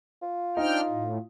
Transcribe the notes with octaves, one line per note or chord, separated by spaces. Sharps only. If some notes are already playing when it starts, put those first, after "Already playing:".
F4
D4 D#4 C5 G5 F6
A2